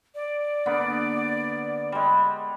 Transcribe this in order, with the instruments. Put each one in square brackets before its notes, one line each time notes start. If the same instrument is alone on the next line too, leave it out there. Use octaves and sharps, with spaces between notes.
[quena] D5
[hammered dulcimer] D3 A#3 B3
G3 G#3